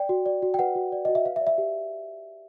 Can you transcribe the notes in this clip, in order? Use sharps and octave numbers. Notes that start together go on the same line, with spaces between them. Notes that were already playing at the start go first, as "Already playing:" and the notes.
Already playing: D5 G5
F#4
D5
F#4
G5
B4 F#5
F#4
D5
F#4 D#5
E5
B4 F5
E5
D5
E5
G4